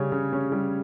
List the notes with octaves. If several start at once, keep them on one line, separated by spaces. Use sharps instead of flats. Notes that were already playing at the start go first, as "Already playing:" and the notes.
Already playing: C#3 G3 C#4 C#5
C#3
C#4
G3